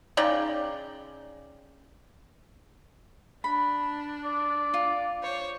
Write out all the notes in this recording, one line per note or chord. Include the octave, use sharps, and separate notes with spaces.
C#3 D#4 D5 G5
D4 B5
D5
F4
C5 C#5